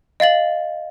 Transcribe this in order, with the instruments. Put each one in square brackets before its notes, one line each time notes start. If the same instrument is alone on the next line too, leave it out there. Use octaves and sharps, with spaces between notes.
[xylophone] D#5 F5 A6 F#7